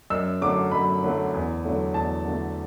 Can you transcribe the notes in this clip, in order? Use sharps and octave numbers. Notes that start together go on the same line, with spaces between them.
F#2 E6
D3 F#3 A3 D6
F#2 B5
D3 F#3 A3
E2
D3 F#3 A3
E2 A5
D3 F#3 A3